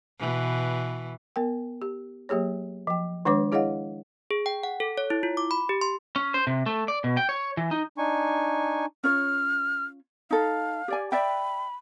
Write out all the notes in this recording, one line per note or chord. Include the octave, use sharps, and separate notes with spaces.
B2 E3
B3 A#4 G5
G4
F#3 A#3 G4 G#4 C#5
F3 G5
D#3 G#3 D4 B4 C#5 D6
E4 G#4 C#5 D#5 F5 F#5
G#4
G5
F#5
A4
C#5
E4
F4
D6
B5
G4
C6
C#4
C5
C3
A3
D5
B2
G5
C#5
E3
D#4
D4 D#4 G#5 C#6
C#4 F4 C#5 F6
D#4 A4 F5
G4 D5 G#5
D5 E5 G5 B5